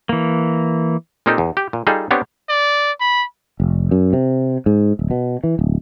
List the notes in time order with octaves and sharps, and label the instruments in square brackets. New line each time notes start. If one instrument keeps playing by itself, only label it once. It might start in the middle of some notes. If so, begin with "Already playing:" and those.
[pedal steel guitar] E3 A#3
[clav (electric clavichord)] A#2 A#3 C4 D#4 G4 A4
E2
G4
A#2
G3 D#4 F4 G#4 A4
B3 C4 D4 G4 C#5
[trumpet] D5
B5
[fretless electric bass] F1
F#2
C3
G#2
D1
B2
E3
D1